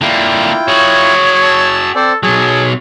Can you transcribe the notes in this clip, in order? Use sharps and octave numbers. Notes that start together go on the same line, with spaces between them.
D3 A#3 E4 F4 G5
F#4 G#4 C#5
A5 E6
C4 A4 C5 D5
B1 F#3 G#4 A5